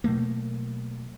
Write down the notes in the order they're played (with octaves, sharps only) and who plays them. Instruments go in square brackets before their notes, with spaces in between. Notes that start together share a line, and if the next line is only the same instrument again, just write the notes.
[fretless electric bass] B2 F#3 A3 A#3